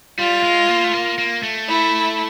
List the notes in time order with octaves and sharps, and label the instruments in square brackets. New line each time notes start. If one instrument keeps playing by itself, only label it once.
[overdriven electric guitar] G3 [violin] F4
[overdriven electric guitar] G#3
A#3
A3
A#3
A#3
A3
[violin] E4